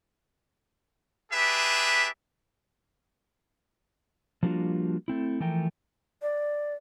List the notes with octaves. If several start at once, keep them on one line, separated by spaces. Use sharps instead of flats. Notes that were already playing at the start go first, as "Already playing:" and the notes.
D4 G4 G#4 B4 E5
F3 G3 A#3 D4 F4 F#4
A3 C4 E4
E3 F3 A3 A#4 G5
D5